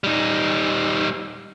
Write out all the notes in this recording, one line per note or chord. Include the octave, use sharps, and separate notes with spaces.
G3 D#4